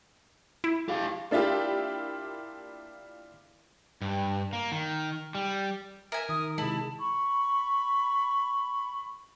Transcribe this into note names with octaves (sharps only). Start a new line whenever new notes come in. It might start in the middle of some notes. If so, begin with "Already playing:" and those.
E4
G4 F5
A#3 D4 E4 F4 G4
G2
A#3
D#3
G3
A#4 E5 G#5
D#3 D#6
C3 G#3 E4 A5
B5 C#6